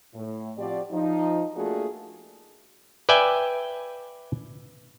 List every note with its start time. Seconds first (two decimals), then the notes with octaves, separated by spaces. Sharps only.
0.13 A2
0.57 F3 C4 F#4 G4 D5
0.91 F3 D#4
1.54 A3 A#3 D4 F4 F#4 G#4
3.09 B4 D5 E5 G5 G#5